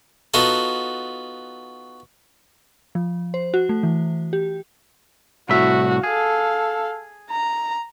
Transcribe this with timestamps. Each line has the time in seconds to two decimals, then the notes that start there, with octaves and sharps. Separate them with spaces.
0.34 B3 D#4 F4 F#4 A4
2.95 F3
3.34 C5
3.54 F#4
3.69 A3
3.83 E3
4.33 G4
5.49 C2 A2 F#4 E5
6.04 G#4 A4 F5
7.31 A#5